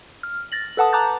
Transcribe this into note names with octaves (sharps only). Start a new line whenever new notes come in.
F6
A6 A#6 F#7
A4 B4 F#5 A5 D#6
A5 A#5 D6 F#6 G6 A6